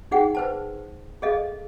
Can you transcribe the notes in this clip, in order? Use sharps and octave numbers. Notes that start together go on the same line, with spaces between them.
D#4 G#4 F#5 G5
B4 C5 A5
G#4 A4 D#5 F5